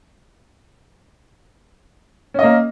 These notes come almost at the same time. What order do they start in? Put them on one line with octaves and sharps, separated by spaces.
C#4 D#5 A#3